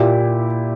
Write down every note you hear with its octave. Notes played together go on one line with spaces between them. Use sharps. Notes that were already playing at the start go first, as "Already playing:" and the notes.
Already playing: A#2 E4 G4